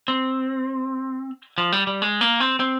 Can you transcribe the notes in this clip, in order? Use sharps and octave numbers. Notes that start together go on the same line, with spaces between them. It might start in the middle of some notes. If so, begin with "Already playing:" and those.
C4
F3
G3
G3
G#3
A#3
C4
C4